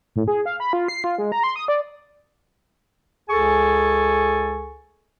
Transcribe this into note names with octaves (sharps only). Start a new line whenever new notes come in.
A2
G#4
F5
B5
F4
C7
F4
G#3
A#5
C6
D#6
D5
C#2 G#4 A4 G#5 C#6